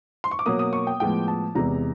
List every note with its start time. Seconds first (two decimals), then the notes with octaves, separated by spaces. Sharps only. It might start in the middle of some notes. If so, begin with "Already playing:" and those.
0.24 C6
0.31 C#6
0.39 D6
0.46 B2 F#3 A#3 D#6
0.59 D#6
0.73 C#6
0.87 G5
1.00 A2 F3 G#3 B3 G5
1.28 A5
1.55 E2 C3 E3 G#3 A#5